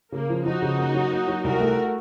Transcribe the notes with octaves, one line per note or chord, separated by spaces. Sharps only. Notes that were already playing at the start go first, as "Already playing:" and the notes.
C#3 A#3
F3
F3 D#4 F#4
C#3
A#3
F#3
A#3
F#3
C2 F#4 A#4
A3